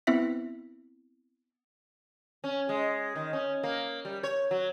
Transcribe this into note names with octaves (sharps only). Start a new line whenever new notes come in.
B3 C4 E4 E5 B6
C#4
G#3
D#3
C#4
A#3
G3
C#5
F#3